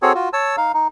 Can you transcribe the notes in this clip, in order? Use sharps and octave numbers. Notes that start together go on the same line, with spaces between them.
C4 F#4 G#4 A4 C#5
F4 F#4
C#5 A5 E6
D#4 F5
D#4